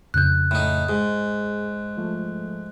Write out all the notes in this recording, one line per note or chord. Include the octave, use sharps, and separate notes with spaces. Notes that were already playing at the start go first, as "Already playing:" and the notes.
F2 C#3 F#6 G6
A2 D#4
G#2 G#4
F3 A3